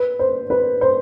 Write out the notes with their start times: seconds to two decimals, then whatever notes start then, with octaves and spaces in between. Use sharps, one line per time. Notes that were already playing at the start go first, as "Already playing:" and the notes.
Already playing: B4
0.19 C5
0.50 B4
0.81 C5